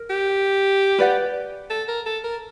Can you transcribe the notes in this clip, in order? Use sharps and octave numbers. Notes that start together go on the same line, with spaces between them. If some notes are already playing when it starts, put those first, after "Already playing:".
Already playing: A#4
G4
B4 D5 F#5
A4
A#4
A4
A#4